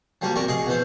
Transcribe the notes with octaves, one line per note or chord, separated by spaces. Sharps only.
F3 G3 A#3 F#4
C3 A#4 D5 C#6
G#4 D#5 F5 F#5
B2 E3 C5